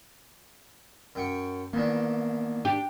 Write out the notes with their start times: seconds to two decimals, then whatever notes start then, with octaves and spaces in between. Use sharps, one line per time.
1.15 F#2 G5 C#6
1.73 D#3 E3 A#3 B3 D4
2.65 D4 G4